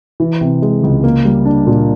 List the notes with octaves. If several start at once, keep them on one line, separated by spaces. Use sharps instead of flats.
E3
C3
G#3
C#2
A#3
G3
D4
A#2